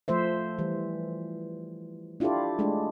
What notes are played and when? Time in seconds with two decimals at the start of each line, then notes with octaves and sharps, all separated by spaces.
0.08 F3 A3 C5 E5
0.58 E3 G3
2.20 D4 E4 F4 G4 A4 D5
2.59 G#3 A3 D4